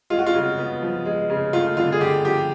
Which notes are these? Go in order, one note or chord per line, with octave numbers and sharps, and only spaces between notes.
G#3 F4
F#4
F4
C#3
B3
F3
G#3
C#3
A3 F4
D3 F4
G#4
D3 G4
F3 G4